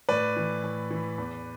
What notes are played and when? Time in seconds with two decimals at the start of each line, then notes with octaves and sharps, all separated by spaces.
0.09 A2 B4 D5
0.36 E3
0.64 A2
0.91 E3
1.18 E2